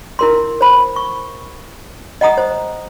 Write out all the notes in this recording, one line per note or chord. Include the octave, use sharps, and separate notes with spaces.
E4 A#4 C6
C5 B5
C#6
D#5 F#5 A#5 D#6
C5